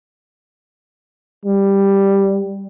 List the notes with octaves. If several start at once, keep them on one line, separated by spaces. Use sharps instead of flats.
G3